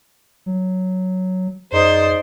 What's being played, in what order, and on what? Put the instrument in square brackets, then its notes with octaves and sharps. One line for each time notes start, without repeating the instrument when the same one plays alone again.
[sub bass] F#3
[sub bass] F#2 [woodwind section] D#4 G#4 D5 [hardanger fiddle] C5